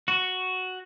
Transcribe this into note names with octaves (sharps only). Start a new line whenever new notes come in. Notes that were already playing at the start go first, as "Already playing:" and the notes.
F#4